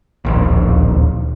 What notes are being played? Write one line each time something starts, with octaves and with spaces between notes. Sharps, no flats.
D1 A#1 D#2